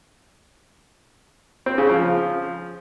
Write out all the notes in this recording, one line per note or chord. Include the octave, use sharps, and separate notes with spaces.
C4
C#3
F3